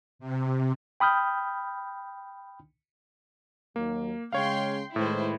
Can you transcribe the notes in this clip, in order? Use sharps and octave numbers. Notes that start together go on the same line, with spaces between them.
C3
G5 B5 D#6 F6 G6
D#2 F#3 A#3
C#3 G#3 C#5 F5 G5 C6
A2 D#3 G#3 E4 B4 C5